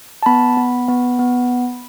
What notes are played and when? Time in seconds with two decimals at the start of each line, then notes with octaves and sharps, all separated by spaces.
0.23 A5
0.26 B3 B5
0.57 B3
0.88 B3
1.19 B3